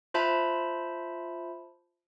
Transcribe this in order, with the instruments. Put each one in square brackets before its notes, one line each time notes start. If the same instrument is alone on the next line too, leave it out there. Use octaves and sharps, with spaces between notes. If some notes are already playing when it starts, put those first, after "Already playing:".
[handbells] F4 C5 E5 A5 B5